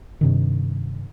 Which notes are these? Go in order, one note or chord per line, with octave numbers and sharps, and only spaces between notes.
G2 C3 D#3